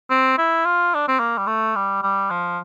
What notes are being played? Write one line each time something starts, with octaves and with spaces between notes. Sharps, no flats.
C4
E4
F4
D4
C4
A#3
G3
A3
G3
G3
F3